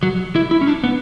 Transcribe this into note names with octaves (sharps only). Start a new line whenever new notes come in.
F#3
E4
E4
C#4
D4
B3